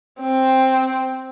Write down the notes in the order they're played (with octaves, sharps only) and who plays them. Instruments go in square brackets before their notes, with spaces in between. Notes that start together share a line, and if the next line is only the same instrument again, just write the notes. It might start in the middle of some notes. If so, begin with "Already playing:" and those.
[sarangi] C4